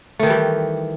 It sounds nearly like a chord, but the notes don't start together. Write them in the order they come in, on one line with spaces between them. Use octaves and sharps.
A3 D#3 E3 G3